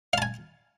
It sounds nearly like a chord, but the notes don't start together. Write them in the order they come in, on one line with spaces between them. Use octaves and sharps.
F5 A5 G#5